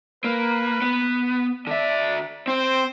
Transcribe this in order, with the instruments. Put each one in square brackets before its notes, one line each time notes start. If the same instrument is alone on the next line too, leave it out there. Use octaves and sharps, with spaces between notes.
[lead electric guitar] A#3 [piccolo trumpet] B4
[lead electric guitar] B3
[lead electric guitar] D3 E5 [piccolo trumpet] D5
[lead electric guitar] C4 [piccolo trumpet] C5